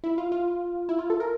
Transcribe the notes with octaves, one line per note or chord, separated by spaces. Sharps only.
E4
F4
F4
E4
F4
A4
A#4